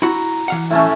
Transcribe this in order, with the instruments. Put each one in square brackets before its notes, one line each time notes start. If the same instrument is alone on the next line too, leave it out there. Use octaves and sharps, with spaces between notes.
[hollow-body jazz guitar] E4 F#4 [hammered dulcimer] A#5
[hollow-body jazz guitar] E3 F5 F#5
[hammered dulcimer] A2 A3 C#4